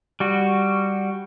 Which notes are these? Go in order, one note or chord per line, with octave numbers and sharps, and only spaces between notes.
G3 F#4